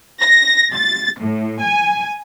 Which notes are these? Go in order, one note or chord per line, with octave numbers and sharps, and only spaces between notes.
A#6
A6
A2
G#5